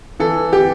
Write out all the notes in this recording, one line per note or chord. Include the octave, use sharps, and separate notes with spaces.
E3 A4
G4